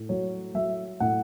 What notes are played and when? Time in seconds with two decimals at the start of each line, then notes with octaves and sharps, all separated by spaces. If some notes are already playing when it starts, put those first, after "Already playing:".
Already playing: A2
0.09 F#3 C#5
0.55 F#3 E5
1.00 A2 F#5